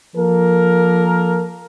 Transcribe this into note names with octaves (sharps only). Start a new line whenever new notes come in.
F3 A#3 A4 A#4